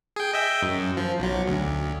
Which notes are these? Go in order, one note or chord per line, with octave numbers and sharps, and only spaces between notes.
G#4 G5
D#5 E5 G5
F#2
F3
B1 F#3
D2